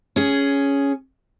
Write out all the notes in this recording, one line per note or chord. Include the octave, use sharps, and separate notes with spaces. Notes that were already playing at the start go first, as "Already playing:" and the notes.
C#4 G#4